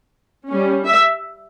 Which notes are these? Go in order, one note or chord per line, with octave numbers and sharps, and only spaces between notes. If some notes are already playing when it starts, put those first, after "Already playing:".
G3 C#4
E5